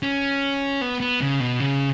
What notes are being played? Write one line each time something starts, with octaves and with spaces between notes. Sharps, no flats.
C#4
B3
B3
C#3
B2
C#3